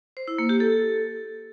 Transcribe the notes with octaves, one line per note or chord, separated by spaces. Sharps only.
C5
E4
A#3
G4
A4